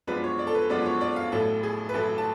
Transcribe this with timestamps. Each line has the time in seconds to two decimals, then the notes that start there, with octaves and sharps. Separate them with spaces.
0.07 F#2 F3 G#3 B3 D4 B4
0.24 C#5
0.39 D5
0.47 A4
0.54 B4
0.70 F#2 F3 G#3 B3 D4 D5
0.86 C#5
1.01 D5
1.16 F5
1.32 A1 A2 F#3 A4
1.63 G#4
1.89 B4
1.94 A1 A2 F#3 A4
2.18 A5